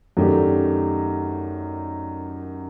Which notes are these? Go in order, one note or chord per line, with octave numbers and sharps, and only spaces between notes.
F#2 D#3 A3 D4 G4